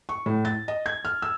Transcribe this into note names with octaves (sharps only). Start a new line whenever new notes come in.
C#6
A2
A6
D#5
G#6
F6
E6